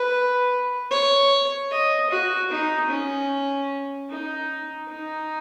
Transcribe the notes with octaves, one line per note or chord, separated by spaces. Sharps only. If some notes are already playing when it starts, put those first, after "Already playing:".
Already playing: B4
C#5
D#5
F#4
D#4
C#4
D#4
D#4